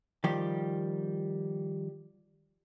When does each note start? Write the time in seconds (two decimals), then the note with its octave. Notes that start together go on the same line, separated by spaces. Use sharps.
0.24 D#3 F3 G3 G4